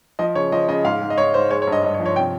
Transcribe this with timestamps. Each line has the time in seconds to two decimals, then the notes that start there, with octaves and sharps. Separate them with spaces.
0.19 F3 D#5
0.35 C#3 C#5
0.52 F3 D#5
0.68 C#3 D#5
0.85 G#2 F5
1.02 G#2
1.10 D#5
1.18 G#2 C#5
1.34 G#2 C5
1.51 G#3 C#5
1.62 C#5
1.67 G2
1.72 D#5
1.83 G2 D#5
1.94 C#5
2.00 F3
2.06 C#5
2.16 C3 G5